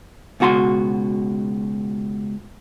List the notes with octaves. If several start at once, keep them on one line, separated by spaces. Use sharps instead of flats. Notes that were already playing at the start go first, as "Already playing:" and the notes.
C#2 B2 F#4 A#5 C6